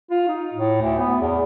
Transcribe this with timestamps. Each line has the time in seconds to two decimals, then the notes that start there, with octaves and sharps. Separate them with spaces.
0.11 F4
0.28 D#4
0.53 A2
0.81 D2
0.99 B3
1.20 E2